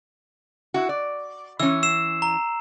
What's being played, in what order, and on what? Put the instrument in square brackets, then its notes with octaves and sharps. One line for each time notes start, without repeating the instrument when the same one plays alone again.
[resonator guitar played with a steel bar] E4 F#4
D5
[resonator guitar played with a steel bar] E3 C#4 [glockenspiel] E6
[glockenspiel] E6 C7 E7
A#5